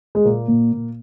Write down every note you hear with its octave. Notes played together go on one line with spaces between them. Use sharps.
G#3
A#2 A#3
A#2
A#2